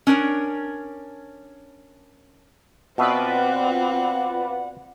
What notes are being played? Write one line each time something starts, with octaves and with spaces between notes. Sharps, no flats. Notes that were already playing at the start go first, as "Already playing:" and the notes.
C#4 D4 A#4 C#5
B2 B3 C4 F4 B4 D5 E5 F#5